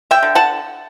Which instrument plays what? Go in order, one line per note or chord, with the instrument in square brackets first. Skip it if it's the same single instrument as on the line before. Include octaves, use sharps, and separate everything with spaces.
[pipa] E5 G5
D3
F#5 A5